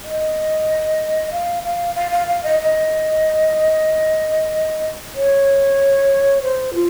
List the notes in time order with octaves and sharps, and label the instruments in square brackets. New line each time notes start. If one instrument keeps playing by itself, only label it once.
[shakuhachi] D#5
F5
F5
F5
F5
F5
D#5
D#5
C#5
C5
F4